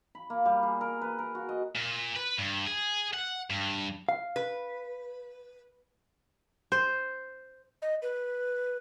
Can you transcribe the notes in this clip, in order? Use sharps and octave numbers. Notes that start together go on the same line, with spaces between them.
B5
A#3
G3
G#4
A#4
B4
A#4
F#4
D#5
A#2
B4
G2
G#4
F#5
G2
F5
B4
C5
D#5
B4